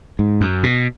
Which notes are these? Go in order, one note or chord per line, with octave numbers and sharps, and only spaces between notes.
G#2
F#2
B2